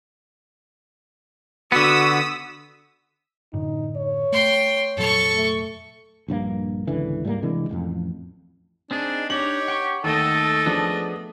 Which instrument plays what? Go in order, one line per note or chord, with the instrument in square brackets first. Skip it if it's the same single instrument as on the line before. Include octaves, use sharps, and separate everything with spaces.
[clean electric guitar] D3 B3 [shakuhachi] F#4 [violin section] D#6 E6 B6
[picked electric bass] F#2 A2 D3 [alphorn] D#4
[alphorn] C#5
[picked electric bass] A3 [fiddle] G5 C6
[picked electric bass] F1 A#2 F#3 [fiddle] A4 C#6
[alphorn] A3
[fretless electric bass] A#1 G2 F3 A#3
G#1 C#2 D3 E3
G#2 G3 G#3 A#3
C3 E3 G#3 D4
E1 A1 F2
[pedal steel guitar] C4 D#4 G#4 [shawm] D4
[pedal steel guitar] D4 D#4 [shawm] G4 [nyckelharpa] C#5 [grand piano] F#7
[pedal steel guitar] F#5 G5 C#6
[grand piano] D#2 [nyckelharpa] A3 D#5 [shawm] A4
[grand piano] F3 D4 [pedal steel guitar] B3 G#4